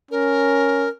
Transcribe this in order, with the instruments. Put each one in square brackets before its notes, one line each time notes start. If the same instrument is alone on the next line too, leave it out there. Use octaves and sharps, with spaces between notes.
[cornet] C#4 [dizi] A#4